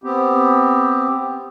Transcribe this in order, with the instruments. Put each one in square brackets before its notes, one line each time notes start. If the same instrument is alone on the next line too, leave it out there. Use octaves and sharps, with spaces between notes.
[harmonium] B3 C4 G4